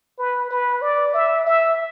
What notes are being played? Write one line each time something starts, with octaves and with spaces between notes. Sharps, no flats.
B4
B4
D5
E5
E5